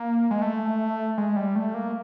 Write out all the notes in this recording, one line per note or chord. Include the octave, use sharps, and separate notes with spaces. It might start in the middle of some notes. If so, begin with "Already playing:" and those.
Already playing: A#3
G#3
A3
G#3
G3
A3
A#3